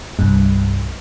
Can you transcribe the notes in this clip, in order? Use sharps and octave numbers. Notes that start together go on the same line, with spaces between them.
C2 G2